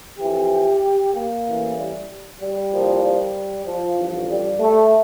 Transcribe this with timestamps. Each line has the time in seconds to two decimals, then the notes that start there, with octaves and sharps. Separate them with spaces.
0.19 F2 E3 G4
1.13 A#3
1.45 A1 A2 E3
1.77 G3
2.41 G3
2.71 C2 A#2 F3
3.04 G3
3.66 F3
3.97 A1 G2 D3 F3
4.30 G3
4.60 A3